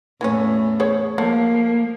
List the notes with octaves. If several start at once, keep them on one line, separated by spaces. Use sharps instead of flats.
E2 A2 E3 A3 B3 C#4
G#4 C5 C#5
F3 A3 A#3